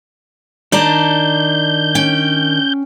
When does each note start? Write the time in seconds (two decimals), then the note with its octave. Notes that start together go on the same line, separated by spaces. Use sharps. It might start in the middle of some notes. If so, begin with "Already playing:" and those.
0.72 D#3 D4 D5 A5 A#5 G6
1.95 C#4 G5